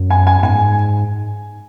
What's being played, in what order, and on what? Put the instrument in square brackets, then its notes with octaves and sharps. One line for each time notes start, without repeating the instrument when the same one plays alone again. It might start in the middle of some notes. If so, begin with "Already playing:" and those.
Already playing: [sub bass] F#2
[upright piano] G#5
G#5
[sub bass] G#2 [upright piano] G#5